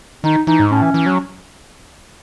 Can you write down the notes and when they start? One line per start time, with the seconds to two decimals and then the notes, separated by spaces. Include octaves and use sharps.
0.24 D#3 D#4
0.47 E3 D#4
0.59 G#2
0.71 A2 C#4
0.82 E3
0.94 E3
1.06 F#3